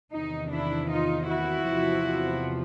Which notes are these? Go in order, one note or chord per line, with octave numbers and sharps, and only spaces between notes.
E2 C3 D#3 D#4
D4 E4
D#4 F4
E4 F#4
E2 C3 F3